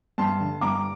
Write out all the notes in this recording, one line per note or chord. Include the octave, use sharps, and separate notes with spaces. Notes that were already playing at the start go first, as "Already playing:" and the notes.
G2 A5 C6
D3
G2 A#5 D6